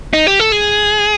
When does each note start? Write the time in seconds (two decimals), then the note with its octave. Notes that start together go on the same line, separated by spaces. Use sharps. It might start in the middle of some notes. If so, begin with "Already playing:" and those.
0.13 D#4
0.27 G4
0.40 A4
0.52 G#4